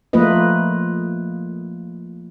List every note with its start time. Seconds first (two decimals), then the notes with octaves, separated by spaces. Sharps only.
0.13 F3 A3 A#3 F4 B4 D#5